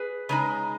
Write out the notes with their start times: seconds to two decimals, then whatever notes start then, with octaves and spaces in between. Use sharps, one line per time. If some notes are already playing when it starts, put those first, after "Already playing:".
Already playing: G#4 B4
0.29 C#3 G#3 D#4